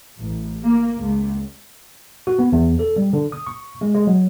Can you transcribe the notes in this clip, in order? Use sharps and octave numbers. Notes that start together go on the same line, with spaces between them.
A1
A#3
C#2
F#4
B3
E2
A4
G3
D3
D#6
C#6
G#3
G#3
F#3